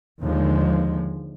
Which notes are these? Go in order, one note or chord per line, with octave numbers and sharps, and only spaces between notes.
D#2 D3 F3 G#3